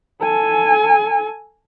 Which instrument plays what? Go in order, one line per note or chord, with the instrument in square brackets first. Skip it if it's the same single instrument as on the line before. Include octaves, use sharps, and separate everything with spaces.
[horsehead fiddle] A4 G#5